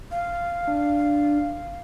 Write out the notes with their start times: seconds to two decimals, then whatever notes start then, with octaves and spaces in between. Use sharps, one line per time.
0.11 F5
0.68 D4